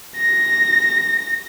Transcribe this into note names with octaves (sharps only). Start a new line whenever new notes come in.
A#6